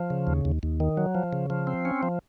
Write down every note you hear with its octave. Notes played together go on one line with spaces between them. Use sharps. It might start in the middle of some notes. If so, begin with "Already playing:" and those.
Already playing: F3
C#3
D#2
D#2
D#2
D#3
F#3
F3
C#3
F3
C4
C#4
F3